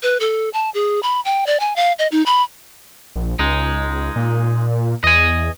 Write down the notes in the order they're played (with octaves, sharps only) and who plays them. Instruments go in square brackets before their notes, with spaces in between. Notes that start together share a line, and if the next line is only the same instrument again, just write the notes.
[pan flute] B4
A4
A5
G#4
B5
G5
D5
G#5
F5
D#5
D#4
B5
[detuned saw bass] A#1
[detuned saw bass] C#2 [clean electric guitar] G#3 D#4
[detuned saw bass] A#2
[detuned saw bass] E2 [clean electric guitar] D#5 G#5